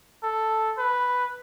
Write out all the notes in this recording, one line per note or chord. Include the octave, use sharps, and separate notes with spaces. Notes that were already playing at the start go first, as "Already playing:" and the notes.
A4
B4